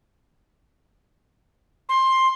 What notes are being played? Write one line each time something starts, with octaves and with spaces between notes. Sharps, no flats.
C6